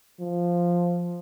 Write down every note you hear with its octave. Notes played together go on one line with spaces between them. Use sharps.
F3